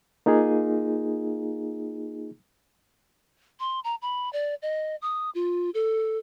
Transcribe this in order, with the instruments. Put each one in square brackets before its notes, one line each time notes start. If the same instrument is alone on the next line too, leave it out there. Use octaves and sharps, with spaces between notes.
[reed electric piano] A#3 D#4 F4 G#4
[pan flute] C6
A#5
B5
D5
D#5
D#6
F4
A4